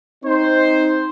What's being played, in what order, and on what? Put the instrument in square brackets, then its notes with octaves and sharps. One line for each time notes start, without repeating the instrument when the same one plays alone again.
[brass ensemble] C4 D#4 C5